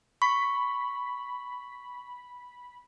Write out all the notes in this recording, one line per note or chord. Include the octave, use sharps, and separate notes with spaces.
B5 C#6